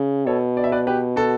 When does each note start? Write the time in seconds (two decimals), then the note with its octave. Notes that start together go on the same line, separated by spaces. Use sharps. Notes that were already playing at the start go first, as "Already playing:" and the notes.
Already playing: C#3
0.26 B2 A4 C#5
0.57 D5
0.64 E5
0.72 B4 D5
0.87 G4 B4
1.16 F#4 A4